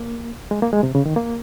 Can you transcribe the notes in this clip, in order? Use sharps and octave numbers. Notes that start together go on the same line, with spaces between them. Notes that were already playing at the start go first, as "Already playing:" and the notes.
Already playing: A#3
G#3
A#3
G#3
C3
C#3
D#3
A#3